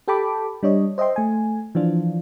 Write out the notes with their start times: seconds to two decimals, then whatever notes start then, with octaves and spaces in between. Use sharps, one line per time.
0.08 G4 A4 G5 A5 B5 D6
0.63 G3 D4 C#5 D#5
0.98 C5 D#5 E5 G5 C6
1.16 A3 G#5
1.75 E3 F3 D4 F4